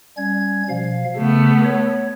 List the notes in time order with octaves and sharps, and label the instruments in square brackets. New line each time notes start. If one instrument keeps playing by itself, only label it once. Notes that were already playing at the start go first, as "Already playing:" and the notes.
[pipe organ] G3 C#4 G#6
B2 F3 F5
[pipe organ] C#3 [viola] A3 B3
[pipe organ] C#5